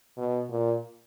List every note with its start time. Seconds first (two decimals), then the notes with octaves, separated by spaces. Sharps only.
0.17 B2
0.51 A#2